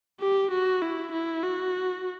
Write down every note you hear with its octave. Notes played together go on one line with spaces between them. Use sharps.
G4
F#4
E4
E4
F#4